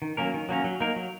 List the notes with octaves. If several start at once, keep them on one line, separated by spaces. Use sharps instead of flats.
D#3
F#3 A#3 C#4 A#4
D#3
F#3 A#3 C#4 A#4
F#3
A#3 D#4 A#4
F#3